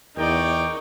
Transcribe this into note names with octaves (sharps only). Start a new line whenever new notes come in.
E2 D#4 A#4 D5 G5 C#6